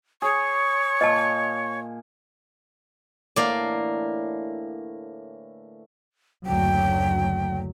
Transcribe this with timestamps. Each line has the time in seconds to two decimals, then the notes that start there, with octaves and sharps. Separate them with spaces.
0.22 G#4 C#5 C#6
1.01 A#2 D#5 A5
3.36 A2 D3 E3 A#3 D5
6.46 F#1 D2 F#3 G5